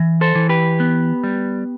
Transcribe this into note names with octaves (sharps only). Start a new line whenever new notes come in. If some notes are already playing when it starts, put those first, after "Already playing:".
Already playing: E3
A4 C5
E3
G4 B4
B3
G3